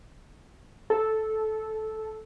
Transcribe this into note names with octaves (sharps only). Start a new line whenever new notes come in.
A4